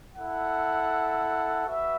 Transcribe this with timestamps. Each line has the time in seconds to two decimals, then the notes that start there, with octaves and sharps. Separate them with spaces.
0.14 E4 A4 F#5
1.66 F#4 B4 E5